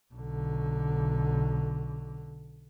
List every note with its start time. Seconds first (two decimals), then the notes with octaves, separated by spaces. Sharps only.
0.13 B1 D3